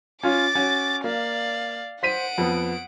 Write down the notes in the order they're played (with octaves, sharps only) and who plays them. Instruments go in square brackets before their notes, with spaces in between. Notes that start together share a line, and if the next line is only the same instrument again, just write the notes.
[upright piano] C#4 F4 [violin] D6 A6
[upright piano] C#4 F#4
[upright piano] A#3 [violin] D5 F5
[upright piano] C5 B6 D#7 [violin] F#5 D7
[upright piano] F2 B3